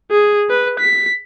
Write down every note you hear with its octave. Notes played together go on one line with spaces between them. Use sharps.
G#4
B4
B6